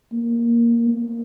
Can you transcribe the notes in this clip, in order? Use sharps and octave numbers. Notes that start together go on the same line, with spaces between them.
A#3
A#3